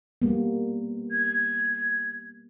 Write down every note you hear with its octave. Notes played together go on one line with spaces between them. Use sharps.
G3 A#3 B3
G#6